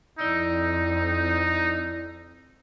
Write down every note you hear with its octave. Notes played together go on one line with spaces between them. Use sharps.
F2 D#4 E4 D5 E6